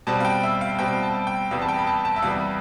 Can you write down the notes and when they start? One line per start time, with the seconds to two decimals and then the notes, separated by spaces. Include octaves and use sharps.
0.07 B2 G3 C4 A5
0.20 F5
0.25 G5
0.43 E5
0.61 F5
0.79 B2 G3 C4 G5
1.03 A5
1.27 G5
1.51 E2 C3 G3 B3 F5
1.62 A5
1.68 G5
1.79 B5
1.87 A5
2.05 A5
2.16 E5
2.22 E2 C3 G3 B3 F5